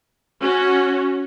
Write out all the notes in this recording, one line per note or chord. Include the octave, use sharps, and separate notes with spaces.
C#4 F#4